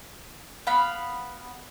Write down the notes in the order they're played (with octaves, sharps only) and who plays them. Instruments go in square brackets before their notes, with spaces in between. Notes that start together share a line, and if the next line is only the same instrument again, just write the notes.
[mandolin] B3 F5 B5